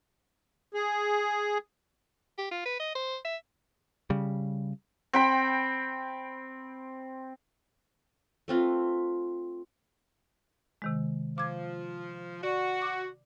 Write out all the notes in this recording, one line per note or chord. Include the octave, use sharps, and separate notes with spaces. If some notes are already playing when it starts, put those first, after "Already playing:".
G#4
G4
F4
B4
D#5
C5
E5
C#3 G3
C4 G5 B5
A3 C4 F4 B4
C3 D#3 G#3
F3 D6 G#6
F#4 D5
D6